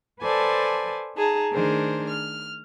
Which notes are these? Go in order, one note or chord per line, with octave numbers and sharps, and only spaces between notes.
A4 B4 C5 D5 G#5 A5
D#4 G#4 A5 A#5
D#3 A3 D4 G#4 A#4 C5
F6